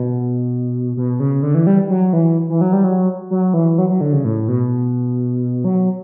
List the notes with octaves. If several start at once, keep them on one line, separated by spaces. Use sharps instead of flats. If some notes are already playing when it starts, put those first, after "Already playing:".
Already playing: B2
B2
C#3
D3
E3
G3
F#3
E3
E3
F#3
G3
F#3
F#3
E3
F#3
F#3
D3
C#3
A2
B2
F#3